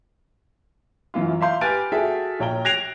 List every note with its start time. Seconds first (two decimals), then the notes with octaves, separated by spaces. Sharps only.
1.14 F#2 E3 F4
1.41 E5 F5 C6 G6
1.61 G4 B4 G#5 F6 A6 D7
1.92 F#4 G#4 A4 E5 G5
2.40 A#1 C#5 G5 A#5 G7
2.65 F#6 G#6 A#6 C7 D7 F7